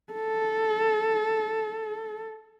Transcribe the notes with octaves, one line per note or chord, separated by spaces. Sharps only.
A4